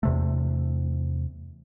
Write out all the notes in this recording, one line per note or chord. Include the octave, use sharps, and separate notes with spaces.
E2 C3 A3